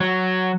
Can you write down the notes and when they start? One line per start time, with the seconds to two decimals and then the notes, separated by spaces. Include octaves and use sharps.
0.01 F#3